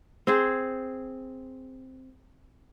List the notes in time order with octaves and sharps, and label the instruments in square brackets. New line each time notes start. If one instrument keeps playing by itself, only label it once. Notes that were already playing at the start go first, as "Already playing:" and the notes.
[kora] C4 G#4 C5